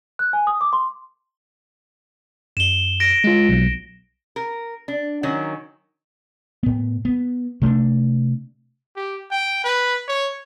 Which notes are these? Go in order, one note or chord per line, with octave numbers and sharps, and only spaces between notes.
F#6
G#5
D#6
D6
C6
F#2 E7 G7
A#6 D7
G#3 F4
B1
A#4
D4
D#3 F#3 C#4
A2 B3
B3
C3 A3 C#4 D4
G4
G5
B4
C#5